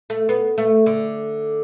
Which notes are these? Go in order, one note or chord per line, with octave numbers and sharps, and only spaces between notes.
A3
B3
A3
D3